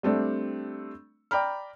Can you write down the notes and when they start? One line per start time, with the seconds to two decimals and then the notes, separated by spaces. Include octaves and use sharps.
0.03 G3 A3 C4 D4
1.31 D5 G5 A#5 B5 F6